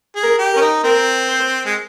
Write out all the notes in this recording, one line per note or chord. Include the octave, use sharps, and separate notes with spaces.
G#4
A#4
G4
C#4 A#4
D#4
C4 A#4
C5
G#3